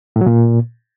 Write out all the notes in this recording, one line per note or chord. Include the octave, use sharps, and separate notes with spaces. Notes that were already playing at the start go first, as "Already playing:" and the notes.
A2
F#3
A#2